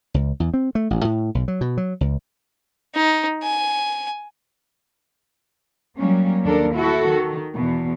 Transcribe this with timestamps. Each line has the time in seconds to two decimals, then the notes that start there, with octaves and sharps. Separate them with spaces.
0.14 C#2
0.40 E2
0.54 C4
0.75 A3
0.90 A1
1.05 A2
1.35 B1
1.48 F#3
1.61 B2
1.77 F#3
2.01 C#2
2.95 D#4
3.43 G#5
5.97 F#3 G3 A#3 C#4
6.44 D#2 D4 A4 A#4
6.75 E4 F#4 A4
7.10 D#3
7.54 E2 B2